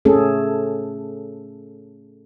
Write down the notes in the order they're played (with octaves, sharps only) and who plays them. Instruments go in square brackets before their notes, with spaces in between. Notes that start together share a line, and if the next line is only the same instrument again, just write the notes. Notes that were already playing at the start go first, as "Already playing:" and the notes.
[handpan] A3 C#4 G#4 A4